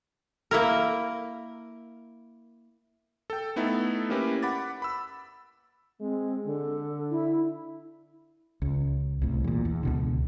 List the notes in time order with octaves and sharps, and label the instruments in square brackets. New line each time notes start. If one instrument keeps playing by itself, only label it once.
[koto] A#3 E4 A#4
[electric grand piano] A4 G5
A3 B3 D#4 E4 A4
A#3 C#4 E4 G4 A#4 B4
F#5 B5 D6 A6
B5 E6
[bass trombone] G#3 [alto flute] C4
[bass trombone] D3 [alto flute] A4
[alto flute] E4
[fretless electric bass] C#2
C2 A2
E2 A#2
E2
C#2 B2 D3